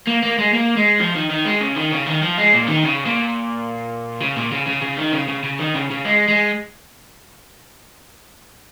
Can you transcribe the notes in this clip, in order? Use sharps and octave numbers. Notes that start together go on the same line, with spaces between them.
A#3
A#3
G#3
A#3
G#3
F3
D#3
D#3
G#3
C#3
D#3
C#3
D#3
F3
G#3
A#2
D#3
C#3
A#2
C#3
A#2
C#3
C#3
C#3
D#3
C#3
C#3
C#3
D#3
C#3
C#3
G#3
G#3